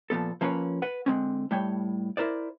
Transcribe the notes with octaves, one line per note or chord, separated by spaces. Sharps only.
A#2 F3 B3 A4
F3 A#3 C#4 B4 C#5
B4 F#5
D3 G#3 C4 C#4
A2 G3 C#5 G5
E4 A#4 C5 D5